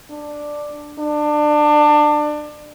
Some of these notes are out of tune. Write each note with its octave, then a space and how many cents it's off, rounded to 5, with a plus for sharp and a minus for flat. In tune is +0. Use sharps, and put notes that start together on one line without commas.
D4 +5
D4 +25